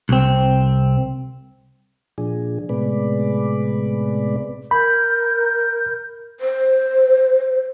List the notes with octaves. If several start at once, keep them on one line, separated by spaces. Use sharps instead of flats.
C2 C4
A#2 F3 D4 G#4
A2 C3 G#3 B3 B4 D5
A#4 B5 G6
C5